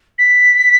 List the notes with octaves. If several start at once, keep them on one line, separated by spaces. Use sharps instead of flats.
B6